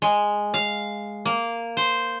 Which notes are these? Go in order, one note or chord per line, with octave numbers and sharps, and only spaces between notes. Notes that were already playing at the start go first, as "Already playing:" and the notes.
G#3
F5
A#3
C5